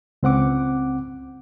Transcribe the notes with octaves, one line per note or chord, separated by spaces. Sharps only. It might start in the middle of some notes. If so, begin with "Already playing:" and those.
C#2 C4 F#5 D6